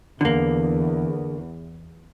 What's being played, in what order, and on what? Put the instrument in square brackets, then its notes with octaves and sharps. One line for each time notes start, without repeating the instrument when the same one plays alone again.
[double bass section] E2 [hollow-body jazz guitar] D3 A#3